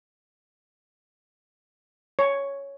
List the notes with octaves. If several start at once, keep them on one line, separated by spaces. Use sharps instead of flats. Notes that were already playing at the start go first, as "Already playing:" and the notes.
C#5